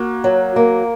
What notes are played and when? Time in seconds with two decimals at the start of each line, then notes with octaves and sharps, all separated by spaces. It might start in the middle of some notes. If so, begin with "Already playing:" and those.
Already playing: A#3 F#4
0.24 F#3
0.56 A#3